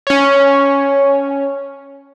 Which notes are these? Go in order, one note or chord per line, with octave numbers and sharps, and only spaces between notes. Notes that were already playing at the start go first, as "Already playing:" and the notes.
C#4 C#5